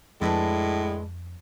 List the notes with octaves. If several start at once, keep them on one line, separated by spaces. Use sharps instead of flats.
F2 A2 G#3 D4 E4 B4